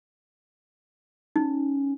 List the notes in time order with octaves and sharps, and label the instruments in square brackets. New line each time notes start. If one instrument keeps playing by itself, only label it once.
[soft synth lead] C#4 [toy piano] D#4